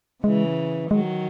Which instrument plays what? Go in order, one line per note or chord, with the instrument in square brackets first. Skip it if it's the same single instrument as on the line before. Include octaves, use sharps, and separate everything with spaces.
[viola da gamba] C#3 E3 [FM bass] G#3
[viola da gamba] D#3 F#3 [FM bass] G#3